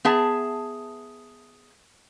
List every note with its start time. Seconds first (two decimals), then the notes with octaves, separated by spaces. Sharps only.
0.05 B3 G#4 E5 A5